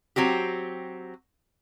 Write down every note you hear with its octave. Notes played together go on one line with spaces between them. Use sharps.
F#3 C4 F#4 G4